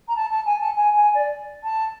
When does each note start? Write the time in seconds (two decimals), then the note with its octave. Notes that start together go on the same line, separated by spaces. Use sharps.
0.07 A#5
0.15 A5
0.30 A5
0.45 G#5
0.60 A5
0.75 G#5
0.94 G#5
1.14 D5
1.63 A5